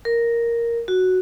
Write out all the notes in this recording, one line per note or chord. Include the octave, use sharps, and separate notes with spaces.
A#4
F#4